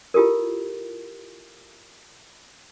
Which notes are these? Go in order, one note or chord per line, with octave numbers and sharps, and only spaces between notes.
E4 F4 G4 A4 A#4